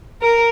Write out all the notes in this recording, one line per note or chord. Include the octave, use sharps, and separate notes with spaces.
A#4